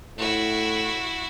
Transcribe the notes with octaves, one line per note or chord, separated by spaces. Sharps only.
A2 E4 F#4